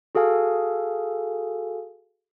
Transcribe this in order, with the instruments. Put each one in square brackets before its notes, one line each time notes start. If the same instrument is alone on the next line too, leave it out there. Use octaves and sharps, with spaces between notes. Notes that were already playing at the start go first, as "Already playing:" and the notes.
[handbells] F#4 G#4 A4 F5 G#5